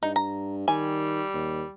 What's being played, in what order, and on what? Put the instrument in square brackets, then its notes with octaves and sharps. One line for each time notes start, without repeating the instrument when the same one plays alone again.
[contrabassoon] G2 [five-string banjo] D#4
[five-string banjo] A#5
[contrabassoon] D#3 [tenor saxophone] G3 [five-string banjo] G#5
[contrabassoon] D#2